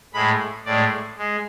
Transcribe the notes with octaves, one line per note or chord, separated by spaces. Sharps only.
A2 G#3 B5
A2 G#3 D5
G#3